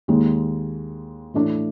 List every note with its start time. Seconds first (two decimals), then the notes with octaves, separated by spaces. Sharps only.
0.08 D#2 D#3 G#3
1.34 A2 E3 A3 D4